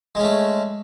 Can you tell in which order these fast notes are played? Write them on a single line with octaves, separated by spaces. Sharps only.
G#3 C#4 A3